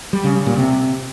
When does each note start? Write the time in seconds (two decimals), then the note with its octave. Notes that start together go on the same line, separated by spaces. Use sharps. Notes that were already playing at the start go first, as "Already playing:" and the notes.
0.13 G3
0.24 C#3
0.35 G3
0.46 A#2
0.57 C3